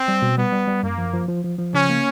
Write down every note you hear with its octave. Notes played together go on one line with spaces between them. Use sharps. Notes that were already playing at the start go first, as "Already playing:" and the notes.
Already playing: C4
G3
B2
G3 B3
G3
G3
F#2 A#3
F3
F3
F3
F3
F3
C#3 C#4
A#3